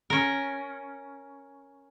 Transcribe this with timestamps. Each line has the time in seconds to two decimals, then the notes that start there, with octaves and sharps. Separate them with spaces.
0.10 C#4 A#4